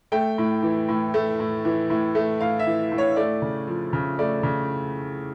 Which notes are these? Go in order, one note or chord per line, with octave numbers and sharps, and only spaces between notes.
A3 G5
A2
E3
A2
A3
A2
E3
A2
A3
A2 F5
E5
E3
A2
C#5
A3 D5
C#3
F3
C#3
A3 D5
C#3